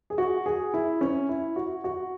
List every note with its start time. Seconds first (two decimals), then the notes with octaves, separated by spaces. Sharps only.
0.10 G#4
0.18 F#4
0.46 G#4
0.74 E4
1.01 C#4
1.29 E4
1.56 F#4
1.84 F#4